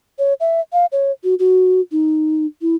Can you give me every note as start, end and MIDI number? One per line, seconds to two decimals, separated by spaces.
0.19 0.34 73
0.40 0.60 76
0.73 0.86 77
0.92 1.11 73
1.24 1.35 66
1.39 1.80 66
1.92 2.46 63
2.62 2.75 64